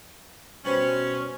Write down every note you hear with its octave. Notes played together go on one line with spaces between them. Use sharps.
B2 G3 C#4 B4 C5